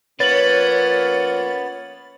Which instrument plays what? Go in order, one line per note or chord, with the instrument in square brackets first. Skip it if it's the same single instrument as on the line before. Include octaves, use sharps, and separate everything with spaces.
[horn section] F3 A#3 C#4 [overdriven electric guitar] B3 B4 [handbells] C#5 [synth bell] A6 F#7